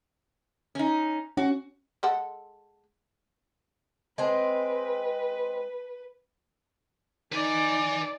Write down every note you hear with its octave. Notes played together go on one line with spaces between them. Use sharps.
C#4 D#4
C#4 F#4
G#3 A4 F#5
G#3 C4 B4
D#4 B4 D5 G#5